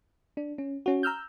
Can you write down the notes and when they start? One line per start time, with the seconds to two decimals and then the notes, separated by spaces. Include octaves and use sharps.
0.37 D4
0.58 C#4
0.86 C#4 F#4
1.03 A#5 E6 F6 G6